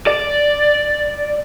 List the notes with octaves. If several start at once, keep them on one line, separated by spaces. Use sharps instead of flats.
D5